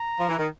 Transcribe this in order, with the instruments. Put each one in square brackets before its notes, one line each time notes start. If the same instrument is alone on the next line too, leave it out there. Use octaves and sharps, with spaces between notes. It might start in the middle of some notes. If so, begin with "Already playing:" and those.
Already playing: [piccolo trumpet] A#5
[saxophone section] F3
E3
D#3